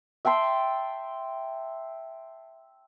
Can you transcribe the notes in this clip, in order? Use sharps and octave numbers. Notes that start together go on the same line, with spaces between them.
E5 G5 A5 C6